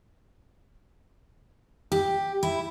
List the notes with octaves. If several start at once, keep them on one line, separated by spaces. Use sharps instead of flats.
G4
E4